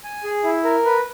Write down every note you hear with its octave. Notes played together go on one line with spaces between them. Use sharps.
G#5
G#4
E4
A#4
B4